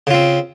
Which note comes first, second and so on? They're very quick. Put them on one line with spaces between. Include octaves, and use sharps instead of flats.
C#3 F4 C4